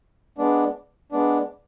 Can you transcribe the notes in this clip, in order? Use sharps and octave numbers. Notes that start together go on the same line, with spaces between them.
G#3 B3 D4
G#3 B3 D4